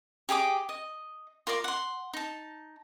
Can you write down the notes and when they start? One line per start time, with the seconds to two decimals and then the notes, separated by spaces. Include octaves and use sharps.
0.29 G4 G#4 D#5 D6
0.69 D#5
1.47 F4 A#4 D5 D6
1.64 F#5 C6
2.13 D#4 A5